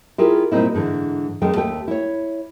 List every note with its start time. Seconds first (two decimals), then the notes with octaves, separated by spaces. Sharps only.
0.18 E4 F4 G4 G#4 A#4
0.52 A#2 G3 C4 D#4 E4
0.74 G#2 D3 E3
1.42 F#2 D#3 G#3 A3 G5
1.55 D#2 A3 G4 G5
1.88 E4 C#5